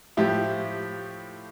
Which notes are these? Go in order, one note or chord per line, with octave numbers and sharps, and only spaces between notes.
A2 F3 E4 G4